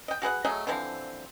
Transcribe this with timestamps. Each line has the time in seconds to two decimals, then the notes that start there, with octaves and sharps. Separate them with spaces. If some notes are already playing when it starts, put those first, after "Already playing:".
0.08 D#5 G5
0.22 F#4 G#4 B4 F#5
0.45 F#3 A3 G#4 D#5
0.67 D3 E3 F3 C4